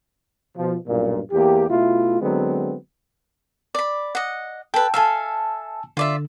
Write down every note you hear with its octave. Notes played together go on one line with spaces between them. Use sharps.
B2 F3
B1 G2 A#2
E2 A#3 G4
B2 A3 E4 F4
D3 F#3 G#3 B3 C4
D5 B5
D#5 F#5
A4 B4 G5
A4 E5 F5 G#5 A5 E6
D3 F4 D5 E5